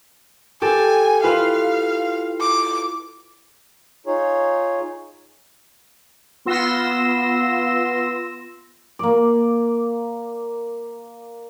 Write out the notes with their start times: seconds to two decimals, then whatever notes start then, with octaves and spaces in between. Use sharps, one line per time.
0.62 G4 A4 G#5
1.24 E4 F4 B4 F5
2.41 D6
4.06 D#4 F4 G#4 C#5
6.45 B3 F4 C6 E6 A#6 E7
8.99 A#3 D5